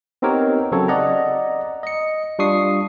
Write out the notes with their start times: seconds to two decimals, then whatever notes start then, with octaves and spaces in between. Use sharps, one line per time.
0.22 B3 C4 D#4 G4 A#4 C#5
0.72 C#3 F#3 C4 A4 C#5
0.88 D5 D#5 F#5 A#5
1.83 D#5 C#7
2.39 G3 D4 F4 C#6 D#6 C7